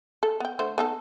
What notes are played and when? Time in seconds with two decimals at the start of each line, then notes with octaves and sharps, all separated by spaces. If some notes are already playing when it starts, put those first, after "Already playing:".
0.23 A4
0.40 B3 G5
0.59 D3 A3 C5
0.78 B3 D#4 A4